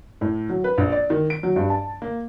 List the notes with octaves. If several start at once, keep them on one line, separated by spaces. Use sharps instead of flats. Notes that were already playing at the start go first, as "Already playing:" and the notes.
A2
F#3
B4
A#1
D5
D#3
D7
F#3
G2
A5
A#3